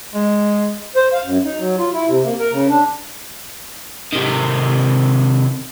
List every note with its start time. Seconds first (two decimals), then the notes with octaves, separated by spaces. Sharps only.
0.14 G#3
0.96 C5
1.13 F5
1.24 F#2
1.44 D#4
1.59 F#3
1.79 F4
1.93 E4
2.08 C3
2.25 A#3
2.39 A#4
2.52 C#3
2.68 D4
4.13 C3 D#3